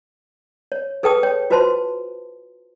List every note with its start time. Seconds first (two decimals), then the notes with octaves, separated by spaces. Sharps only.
0.72 C#5
1.03 G#4 A4 B4 G5 A5 D#6
1.23 C#5 G5
1.50 F4 F#4 B4 C5 A5 C6